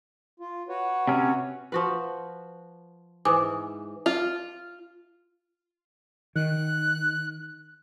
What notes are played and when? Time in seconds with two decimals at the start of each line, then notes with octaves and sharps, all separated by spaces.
0.40 F4
0.69 F#4 B4 C#5
1.07 C3 C#4
1.72 F3 F#4 B4
3.25 G#2 E3 G#5 D6 D#6
4.06 F4
6.35 D#3 F#6